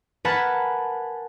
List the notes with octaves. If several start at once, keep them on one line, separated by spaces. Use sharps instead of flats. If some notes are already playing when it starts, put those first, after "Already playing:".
A#4 B4 F#5 G#5 A5 B5